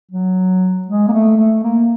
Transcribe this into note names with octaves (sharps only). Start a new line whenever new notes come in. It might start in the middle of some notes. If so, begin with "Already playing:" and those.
F#3
G#3
A#3
A3
A3
A#3